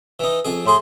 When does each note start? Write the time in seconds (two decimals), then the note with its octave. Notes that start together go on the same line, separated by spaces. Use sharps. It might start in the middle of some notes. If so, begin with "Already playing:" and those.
0.19 E3 D#4
0.45 F2 G#4
0.66 A2 G#4 C6